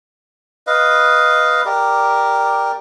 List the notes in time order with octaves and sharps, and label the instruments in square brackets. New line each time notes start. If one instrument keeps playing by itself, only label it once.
[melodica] B4 D#5 F5
G4 A#4 D5